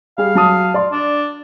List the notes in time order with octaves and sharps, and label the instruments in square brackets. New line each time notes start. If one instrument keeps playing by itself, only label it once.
[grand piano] G3 G#4 [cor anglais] F5
[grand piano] F#3 A5 D#6
D5 C6
[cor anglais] D4